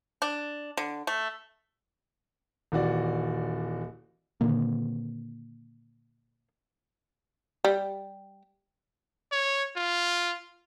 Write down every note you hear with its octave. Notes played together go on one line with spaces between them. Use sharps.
D4
D3
A3
D#1 E3 F#4 D5
A#2 D3 D#3 A#3
G3
C#5
F4